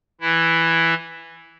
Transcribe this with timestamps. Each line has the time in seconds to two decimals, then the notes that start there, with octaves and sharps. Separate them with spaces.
0.21 E3 E4